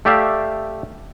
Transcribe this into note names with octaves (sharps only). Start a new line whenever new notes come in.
A3 G4 D5 E5 F5